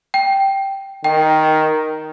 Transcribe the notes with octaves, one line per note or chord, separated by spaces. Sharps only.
G5
D#3 G5